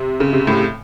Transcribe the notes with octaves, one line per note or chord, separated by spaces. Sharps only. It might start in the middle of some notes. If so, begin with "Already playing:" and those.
Already playing: C3
C#3
C3
A2